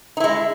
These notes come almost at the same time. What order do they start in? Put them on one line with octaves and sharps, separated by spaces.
D#4 E4 G#3